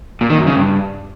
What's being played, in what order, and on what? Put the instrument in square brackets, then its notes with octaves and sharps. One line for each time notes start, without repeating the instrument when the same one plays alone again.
[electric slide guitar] A#2
D#3
F#2
C#3
G2